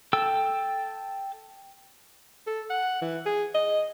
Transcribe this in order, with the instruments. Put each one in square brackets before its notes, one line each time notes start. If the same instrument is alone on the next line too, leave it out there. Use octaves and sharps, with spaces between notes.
[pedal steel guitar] A4 G5 E6
[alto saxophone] A4
F#5
E3
G#4
D#5